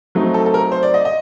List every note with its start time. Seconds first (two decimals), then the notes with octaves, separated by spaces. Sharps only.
0.15 F#3 A3 C4 D#4
0.34 A4
0.46 A4
0.54 A#4
0.72 C5
0.83 D5
0.94 D#5
1.05 D#5